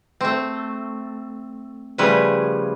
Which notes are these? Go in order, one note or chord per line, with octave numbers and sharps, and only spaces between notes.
A3 C4
C#3 F3 G3 A3 B4 G#5